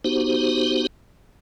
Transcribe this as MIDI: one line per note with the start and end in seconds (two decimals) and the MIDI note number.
0.04 0.87 59
0.04 0.87 63
0.04 0.87 66
0.04 0.87 67
0.04 0.87 72